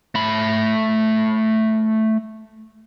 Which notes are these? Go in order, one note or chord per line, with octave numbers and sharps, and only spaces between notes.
A3 B5